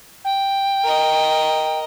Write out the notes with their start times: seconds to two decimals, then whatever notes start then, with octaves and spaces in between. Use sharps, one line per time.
0.24 G5
0.84 A#4 D#5